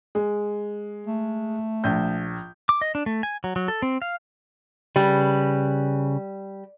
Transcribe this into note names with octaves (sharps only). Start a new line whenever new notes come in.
G#3
A3
A#1 G6
D6
D#5
D4
A3
G#5
F#3
F#3
A4
C4
F5
C#3 G3 B4